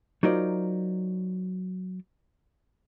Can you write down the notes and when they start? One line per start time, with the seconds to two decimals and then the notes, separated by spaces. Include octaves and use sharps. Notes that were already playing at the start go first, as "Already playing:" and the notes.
0.23 F#3 D#4 F4 A#4 C5 D5